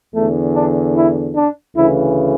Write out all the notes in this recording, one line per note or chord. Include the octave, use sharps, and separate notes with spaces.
E2 D3 A3
D4
E4
D4
D2 C#3 E3 E4